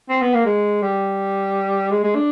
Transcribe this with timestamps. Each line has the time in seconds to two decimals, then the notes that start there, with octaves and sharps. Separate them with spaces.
0.09 C4
0.22 B3
0.34 A#3
0.46 G#3
0.82 G3
1.91 G#3
2.04 G#3
2.15 D4